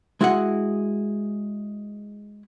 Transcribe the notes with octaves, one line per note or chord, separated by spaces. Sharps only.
G#3 E4 F#4 G#4 F#5